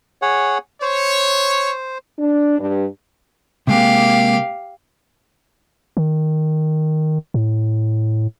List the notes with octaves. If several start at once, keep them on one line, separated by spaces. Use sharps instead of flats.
G#4 C#5 F#5
C5 C#5
D4
G2
C3 G#3 A#3 G4 F5
D#3
A2